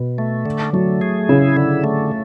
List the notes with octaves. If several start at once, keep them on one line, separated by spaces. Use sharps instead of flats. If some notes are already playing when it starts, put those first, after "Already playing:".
Already playing: B2
A3
D3
F#3 A3
G#4
C#3 E4
D3
A3